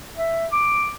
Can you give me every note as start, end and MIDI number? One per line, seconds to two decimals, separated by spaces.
0.17 0.46 76
0.52 0.92 86